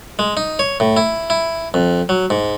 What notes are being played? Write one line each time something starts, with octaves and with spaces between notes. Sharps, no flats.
G#3
D#4
C#5
A2
E4
E4
F2
F#3
G#2